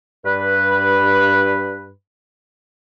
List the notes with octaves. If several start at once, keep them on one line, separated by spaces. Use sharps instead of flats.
G2 B4